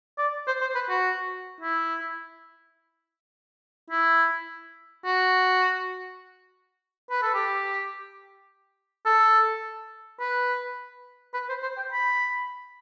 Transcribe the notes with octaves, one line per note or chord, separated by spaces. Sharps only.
D5
C5
C5
B4
F#4
E4
E4
F#4
B4
A4
G4
A4
B4
B4
C5
C5
G5
B5